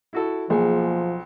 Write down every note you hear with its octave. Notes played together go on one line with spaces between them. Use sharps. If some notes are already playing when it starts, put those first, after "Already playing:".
E4 F#4 A4
B1 F3 A#3 G#4